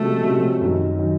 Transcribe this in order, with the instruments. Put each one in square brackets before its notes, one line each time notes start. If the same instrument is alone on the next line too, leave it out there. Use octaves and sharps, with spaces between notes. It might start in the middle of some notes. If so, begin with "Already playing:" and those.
Already playing: [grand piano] C3 F3 G#3 C#4 F#4 [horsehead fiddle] A3
[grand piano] C3 F3 G#3 C#4 F#4
F#2 D#3 F#3
D#3 F#3